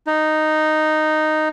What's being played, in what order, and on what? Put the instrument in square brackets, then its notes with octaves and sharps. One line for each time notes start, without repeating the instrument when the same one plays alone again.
[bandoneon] D#4